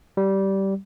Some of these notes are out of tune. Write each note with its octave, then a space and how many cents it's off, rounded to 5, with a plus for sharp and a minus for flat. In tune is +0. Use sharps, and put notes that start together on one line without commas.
G3 -15